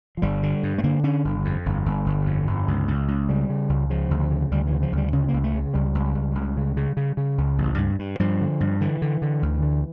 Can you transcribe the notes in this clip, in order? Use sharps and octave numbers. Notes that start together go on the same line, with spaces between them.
F3
G1 G3
D3
G2
A3
D3 A#3
D3 C#4
G1
F2
G1
G1
G1
F2
G1
C#2
C#2
C#2
C#3 G3
C#3
C#2
C#3 F3
D2
C#3
D2 G3
C#3 E3
F3
D2 G3
C#3 C#4
A#3
C#2
A3
C#3
C#2 G3
C#2
C#2
C#2
C#3
C#3
C#3
C#3
C#2
A1
G2
G2
G2 F3
D3
G2
D3 E3
D3
D3
D2
D3